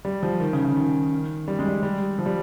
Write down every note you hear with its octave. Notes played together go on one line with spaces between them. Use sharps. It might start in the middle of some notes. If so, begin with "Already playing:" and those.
G3
F3
D#3
C#3
C#3
D#3
G3
G#3
G3
G3
F3
G3